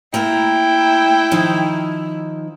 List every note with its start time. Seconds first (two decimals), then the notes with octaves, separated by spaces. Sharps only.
0.14 A3 A#3 E4 G5 A#5
1.31 D#3 F3 D#4